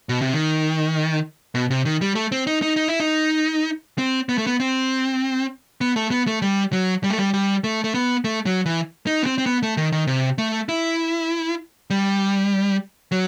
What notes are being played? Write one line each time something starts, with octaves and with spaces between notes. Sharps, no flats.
B2
C3
D#3
B2
C3
D#3
G3
A3
C4
D#4
D#4
D#4
E4
D#4
C4
B3
A3
B3
C4
B3
A3
B3
A3
G3
F#3
G3
A3
G3
G3
A3
A3
B3
A3
F#3
E3
D#4
B3
C4
C4
B3
A3
D#3
D#3
C3
A3
E4
G3
F#3